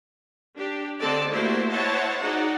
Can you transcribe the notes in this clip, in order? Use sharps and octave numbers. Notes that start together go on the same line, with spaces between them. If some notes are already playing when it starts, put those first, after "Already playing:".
D4 G4
D3 C4 A4 D5 D#5 A5
A3 A#3 E4 F#4 G4 C5
E4 C5 C#5 D#5 F#5 A5
D#4 F#4 G#4 D5 F#5